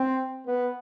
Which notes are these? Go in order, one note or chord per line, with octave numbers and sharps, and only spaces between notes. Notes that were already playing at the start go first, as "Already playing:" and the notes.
Already playing: C4
B3